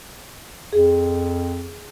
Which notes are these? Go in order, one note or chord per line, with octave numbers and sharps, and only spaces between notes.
F2 G#4